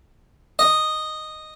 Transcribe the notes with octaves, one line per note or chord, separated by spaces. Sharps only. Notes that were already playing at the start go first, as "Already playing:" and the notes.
D#5